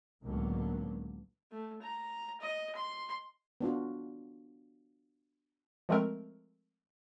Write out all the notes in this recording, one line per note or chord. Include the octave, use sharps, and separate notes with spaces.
C#2 A2 D3 F#3 A#3 B3
A3
A#5
D#5
C6
B3 D4 F4 F#4
F3 G#3 A3 C4 A#4